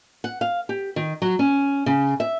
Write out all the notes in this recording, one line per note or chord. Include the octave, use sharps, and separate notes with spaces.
F#5
F5
G4
D#3
F#3
C#4
C#3
E5